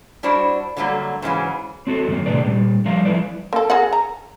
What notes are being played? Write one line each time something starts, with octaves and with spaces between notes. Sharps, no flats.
G3 D4 E4 F#4 C5
D3 F#3 G3 A3 A#3
G#2 C#3 E3 F#3
C4 F#4 A4
F#2 D#3 F#3 A#3
A2 C3 D4 G#4 B4 D5
A#2 G3
F3 G3 A#4 E5 F5
F3 G#3 E4 B4 D5
A#3 A4
G#4 A#4 F#5
A#5